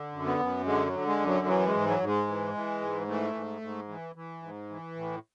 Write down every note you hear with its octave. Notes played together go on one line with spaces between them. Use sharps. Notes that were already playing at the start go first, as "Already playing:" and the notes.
Already playing: D3
F#2
B3
F#2
D3 G#3
F#3
D3
G#3
F#2
F#3
E3 F#3
G#3
G#2
F#3
G#2
G#3
E3
E3
G#2
E3 A3
G#2
G#2
E3
E3
G#2
E3
A2